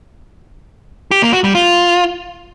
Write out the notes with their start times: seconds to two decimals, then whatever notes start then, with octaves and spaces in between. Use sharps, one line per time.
1.11 G4
1.22 A#3
1.33 F#4
1.44 G3
1.55 F4